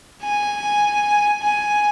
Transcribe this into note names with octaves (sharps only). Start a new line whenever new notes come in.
G#5
G#5